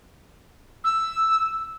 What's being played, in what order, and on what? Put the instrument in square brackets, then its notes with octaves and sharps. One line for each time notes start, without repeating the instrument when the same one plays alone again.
[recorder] E6